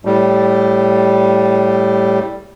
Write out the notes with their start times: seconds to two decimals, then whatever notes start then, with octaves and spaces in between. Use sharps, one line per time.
0.05 A2 G3